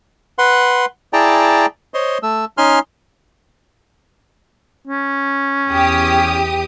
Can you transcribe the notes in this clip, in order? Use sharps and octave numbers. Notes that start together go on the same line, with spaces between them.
B4 F#5 C6
E4 G#4 D5 G5 A5 A#5
C5 C#5 D#5 C6
A3 E6
C#4 D#4 G#5 C6 F6
C#4
E2 G4 D#6